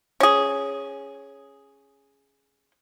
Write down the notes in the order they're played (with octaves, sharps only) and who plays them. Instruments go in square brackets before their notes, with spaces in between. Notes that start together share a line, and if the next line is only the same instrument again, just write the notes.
[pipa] C#4 G#4